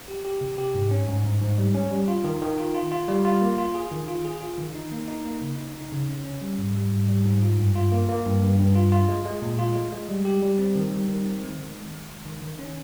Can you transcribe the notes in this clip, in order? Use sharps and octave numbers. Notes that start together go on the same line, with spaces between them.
G4
G4
C3
G4
G#2
C#4
G#2
G#2
G#2
G3
C#4
G3
F4
D#3
D#3
F4
F4
F4
G3
F4
A#3
F4
G#4
D#3
F4
G#4
F4
D#3
D#4
A#3
D#4
A#3
C#3
D#4
D#4
C#3
C#4
C#4
G3
G#2
G3
G#2
G3
G#2
F4
G2
F4
A#3
A#3
G2
G2
G2
F4
F4
G#3
G#3
A#2
F4
G#3
G#3
G3
G4
G3
C4
D#3
G3
D#3
C4
G#3
D#3
G#3
G#3
D#3
D#3
D#3
C#4